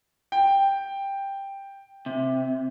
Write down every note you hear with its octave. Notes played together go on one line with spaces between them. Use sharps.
G5
C3